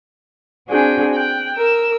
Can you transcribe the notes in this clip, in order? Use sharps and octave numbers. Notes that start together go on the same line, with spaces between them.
C4 D4 F#4 G#4 G5 G#5
G5 F#6
A#4 E6